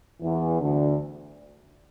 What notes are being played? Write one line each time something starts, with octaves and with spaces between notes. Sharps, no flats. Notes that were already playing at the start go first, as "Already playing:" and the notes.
E2 E3
D2 D3